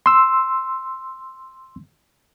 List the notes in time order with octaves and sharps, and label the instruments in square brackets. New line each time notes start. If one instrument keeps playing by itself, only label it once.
[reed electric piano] C6 E6